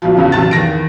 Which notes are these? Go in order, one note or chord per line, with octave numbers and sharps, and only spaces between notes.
B1 B2 F3
E2 G2 C#3
B1 C3 A5 A6
E2 D#3 A#6 D7